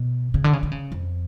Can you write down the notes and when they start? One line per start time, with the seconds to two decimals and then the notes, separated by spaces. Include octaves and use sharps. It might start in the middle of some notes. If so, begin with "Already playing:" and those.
Already playing: B2
0.34 C#3
0.44 D3
0.53 C#3
0.63 D3
0.72 C#3
0.92 F2